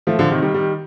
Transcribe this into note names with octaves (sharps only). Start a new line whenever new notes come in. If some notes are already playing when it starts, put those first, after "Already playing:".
F3 A3
D3 F3
C3 D#3
D#3 G3
D#3 G3